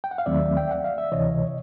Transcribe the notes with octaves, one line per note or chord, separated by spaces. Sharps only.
G5
F#5
F5
D#2 D#3 F#3 A3 C4 D5 E5
G5
F#5
F5
E5
D2 C3 E3 C#5 D#5